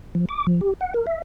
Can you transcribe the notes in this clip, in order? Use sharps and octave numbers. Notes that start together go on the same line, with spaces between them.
F3
D6
F3
G4
F#5
A#4
E5